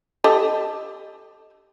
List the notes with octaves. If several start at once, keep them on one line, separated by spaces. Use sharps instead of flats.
G4 A4 D#5